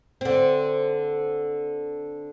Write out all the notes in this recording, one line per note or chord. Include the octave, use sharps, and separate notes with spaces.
D3 C4